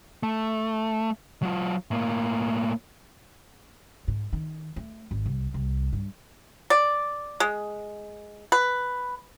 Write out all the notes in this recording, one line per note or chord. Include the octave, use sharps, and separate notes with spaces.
A3
F#3 F4
A2 A#3
G#2
D#3
A3
G#1
C2
C2
G2
D5
G#3
B4